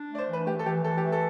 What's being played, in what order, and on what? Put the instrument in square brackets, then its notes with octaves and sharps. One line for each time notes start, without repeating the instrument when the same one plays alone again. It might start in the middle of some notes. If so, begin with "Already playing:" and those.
Already playing: [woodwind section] D4
A3
[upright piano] D5
C5
[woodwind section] E3 [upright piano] B4
[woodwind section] A3 [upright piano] G4
[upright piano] A4
[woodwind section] E3 [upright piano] G4
[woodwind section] E3 [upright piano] A4
[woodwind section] A3 [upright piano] G4
[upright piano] A4